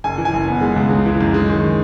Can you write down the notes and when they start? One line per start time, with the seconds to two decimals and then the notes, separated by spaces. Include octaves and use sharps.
0.04 F#1 G#5
0.18 E3
0.25 G#5
0.33 F#1
0.47 B3
0.61 G#3
0.76 C#2
0.90 G#3
1.05 E3
1.21 F#2
1.34 G#3
1.49 D#3